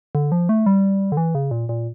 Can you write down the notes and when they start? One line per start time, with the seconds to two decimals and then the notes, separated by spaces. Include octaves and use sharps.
0.15 D3
0.32 F3
0.49 A3
0.66 G3
1.12 D3
1.17 E3
1.35 C#3
1.51 A#2
1.69 A#2